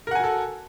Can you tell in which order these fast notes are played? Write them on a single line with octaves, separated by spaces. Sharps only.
A#4 F#5 G#5 F#4 A4